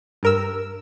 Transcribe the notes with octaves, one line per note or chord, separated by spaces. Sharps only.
G2 A#4 E6